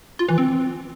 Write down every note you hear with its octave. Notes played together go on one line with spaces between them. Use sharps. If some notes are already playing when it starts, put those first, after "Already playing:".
F4
E3
C4